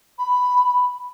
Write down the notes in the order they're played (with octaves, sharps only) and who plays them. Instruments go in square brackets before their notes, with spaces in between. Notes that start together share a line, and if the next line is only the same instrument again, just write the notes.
[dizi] B5